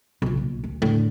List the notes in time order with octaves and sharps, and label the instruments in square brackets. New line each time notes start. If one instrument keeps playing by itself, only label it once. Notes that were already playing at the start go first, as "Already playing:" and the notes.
[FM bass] B1 [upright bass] B2 F4
[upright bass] A#1
D2
[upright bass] E2 D3 [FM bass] A2